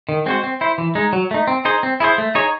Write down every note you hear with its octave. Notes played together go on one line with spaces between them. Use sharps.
D#3
G#3 C4 F#4 C5
C4
E4 C5
E3
G#3 D#4
F#3
A3 D#4
C4
D#4 G#4 C5
C4
E4 G#4 C5
A3
D#4 G#4 C#5